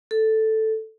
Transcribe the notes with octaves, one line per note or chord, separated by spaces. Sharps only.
A4